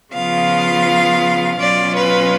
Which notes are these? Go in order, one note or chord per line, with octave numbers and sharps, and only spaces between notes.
C#3 F3 B3 F4 F5
B2 F#3 C#4 F4 D5
B4